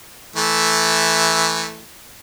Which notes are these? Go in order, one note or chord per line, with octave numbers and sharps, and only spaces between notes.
E3 A3